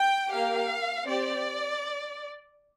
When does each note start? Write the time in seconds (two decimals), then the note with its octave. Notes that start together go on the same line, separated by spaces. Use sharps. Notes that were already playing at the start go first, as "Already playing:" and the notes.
Already playing: G5
0.30 A#3 G4 F5
1.05 C4 G4 D5